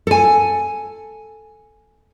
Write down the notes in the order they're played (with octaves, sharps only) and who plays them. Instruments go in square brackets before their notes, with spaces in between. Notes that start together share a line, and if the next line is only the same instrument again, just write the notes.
[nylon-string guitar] A4 G#5